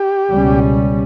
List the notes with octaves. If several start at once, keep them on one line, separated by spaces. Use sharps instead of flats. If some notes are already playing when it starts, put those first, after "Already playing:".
Already playing: G4
C#2 B2 G3 C#4